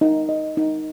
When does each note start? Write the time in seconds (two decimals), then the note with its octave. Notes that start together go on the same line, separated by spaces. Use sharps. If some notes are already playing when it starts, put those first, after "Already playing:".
0.01 D#4
0.29 D#5
0.57 D#4